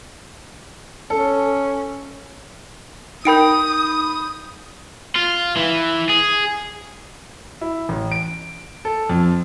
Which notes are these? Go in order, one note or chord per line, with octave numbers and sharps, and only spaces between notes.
C#4 A4
D#4 A#4 G5 B5 D#6 G6 D7
F4
E3
G#4
E4
A1
D7
A4
F2